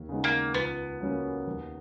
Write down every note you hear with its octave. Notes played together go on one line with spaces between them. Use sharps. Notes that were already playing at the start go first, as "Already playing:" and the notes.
Already playing: D#2
C#3 G#3 B3 D#4
A#3
C#2 B3
C#3 F#3 A#3 C#4
D#2